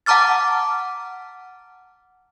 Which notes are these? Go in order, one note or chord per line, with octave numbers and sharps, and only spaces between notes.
F#5 A5 A#5 D6 F6 A6